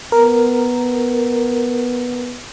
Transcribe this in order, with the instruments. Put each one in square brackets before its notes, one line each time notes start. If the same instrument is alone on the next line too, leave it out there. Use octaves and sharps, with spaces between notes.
[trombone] B3 [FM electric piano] A#4